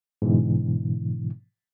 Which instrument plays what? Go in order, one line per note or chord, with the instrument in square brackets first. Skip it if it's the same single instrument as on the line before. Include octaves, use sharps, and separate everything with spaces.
[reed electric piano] G#2 B2 D3 E3